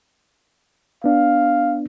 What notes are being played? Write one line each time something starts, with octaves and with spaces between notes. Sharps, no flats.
B3 D4 F5